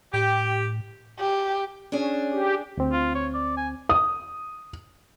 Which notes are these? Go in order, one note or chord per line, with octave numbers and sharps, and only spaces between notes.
A2 G4
G4
C#4 D4 G#4
G4
D2 C4
F4
C#5
D5
G#5
D#6